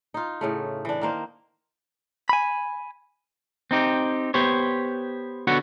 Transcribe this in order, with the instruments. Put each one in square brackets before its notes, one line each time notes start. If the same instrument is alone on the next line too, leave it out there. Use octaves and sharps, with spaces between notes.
[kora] D#4 F4
A2 C#3 A3
E3 D4
D#3 A#3 C5
[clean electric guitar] G#5 B5
C4 D#4 G4
B3 G4 C5 C#5
D3 B3 F#4 C#5